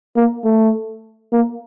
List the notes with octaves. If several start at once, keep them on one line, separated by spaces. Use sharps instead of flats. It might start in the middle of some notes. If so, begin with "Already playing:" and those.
A#3
A3
A#3